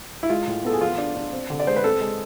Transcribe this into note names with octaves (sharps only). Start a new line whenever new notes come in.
E4
G#3 F4
A2
B3 A4
G#4
F3 F4
D4
D4
C4
D3
D5
G#3 C5
B4
C4 A4
G#3